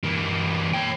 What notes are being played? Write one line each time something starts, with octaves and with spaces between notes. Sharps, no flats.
E3 A#3
C#5 G5